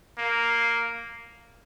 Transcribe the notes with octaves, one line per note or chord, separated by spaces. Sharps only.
A#3